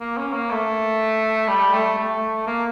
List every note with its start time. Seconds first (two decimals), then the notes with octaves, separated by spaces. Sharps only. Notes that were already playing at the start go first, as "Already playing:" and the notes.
0.01 A#3
0.17 C#4
0.33 A#3
0.51 A3
1.48 G3
1.73 A3
1.98 A3
2.47 A#3